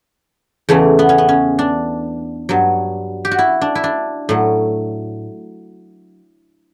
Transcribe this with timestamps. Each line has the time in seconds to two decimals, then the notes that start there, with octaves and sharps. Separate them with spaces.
0.69 E2 C#3 E3 A3
0.99 B3
1.09 C#4
1.18 B3
1.29 C#4
1.59 D4
2.49 G2 F#3
3.25 G4
3.31 F#4
3.39 E4
3.61 D4
3.75 E4
3.84 D4
4.29 A2 F#3